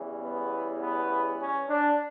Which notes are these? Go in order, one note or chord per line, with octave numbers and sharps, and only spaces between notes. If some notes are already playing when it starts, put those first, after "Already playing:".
Already playing: E2 C#3 E3 G3
B3
B3
C#4
D4